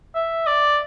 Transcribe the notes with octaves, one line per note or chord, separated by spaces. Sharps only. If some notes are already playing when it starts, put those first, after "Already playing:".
E5
D5